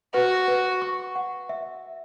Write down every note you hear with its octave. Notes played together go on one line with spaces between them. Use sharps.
F#4 B4
B4
C#6
F#5
E5